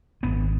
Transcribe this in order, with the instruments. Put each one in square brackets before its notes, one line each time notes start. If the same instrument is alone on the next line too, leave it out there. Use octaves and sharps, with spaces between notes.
[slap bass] G#1 B3